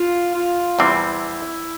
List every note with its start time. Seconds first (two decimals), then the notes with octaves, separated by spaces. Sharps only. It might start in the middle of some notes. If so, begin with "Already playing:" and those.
Already playing: F4
0.35 F4
0.79 E2 C3 E3 G3 C4 E4